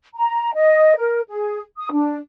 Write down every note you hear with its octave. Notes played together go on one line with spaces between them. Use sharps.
A#5
D#5
A#4
G#4
D#6
D4